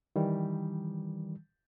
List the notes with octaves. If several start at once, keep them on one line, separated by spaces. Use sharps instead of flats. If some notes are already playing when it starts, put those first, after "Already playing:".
D#3 E3 G3